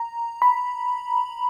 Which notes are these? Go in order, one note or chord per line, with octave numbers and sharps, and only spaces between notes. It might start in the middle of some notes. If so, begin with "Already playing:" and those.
Already playing: A#5
B5